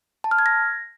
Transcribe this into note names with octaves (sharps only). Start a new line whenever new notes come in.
A5
F6
G#6
A#6